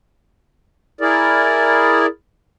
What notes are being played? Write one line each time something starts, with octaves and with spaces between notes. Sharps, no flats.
E4 G#4 A#4 D5